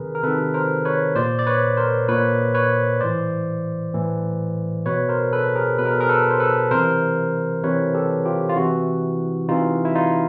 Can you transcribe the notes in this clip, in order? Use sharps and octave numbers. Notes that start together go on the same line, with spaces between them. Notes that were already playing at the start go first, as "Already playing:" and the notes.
Already playing: C3 D#3 G#4 A#4 B4
A#4
C3 D#3 A4 B4
A#4 C5
B4 C#5
A#2 C5 D5
D5
B4 C#5
A#4 C5
A#2 B4 C#5
B4 C#5
A2 E3 C5 D5
A2 E3
B2 B4 C#5
A#4 C5
A4 B4
G#4 A#4
B2 B4
A#4
A4
G#4 A#4
A4 B4
C5
A4 B4
C3 E3 A#4 C5
C3 E3 B4 C#5
G4 A4
F4 G4
F4
C3 E3 E4 F#4
C3 E3 D#4 F4
E4
D#4 F4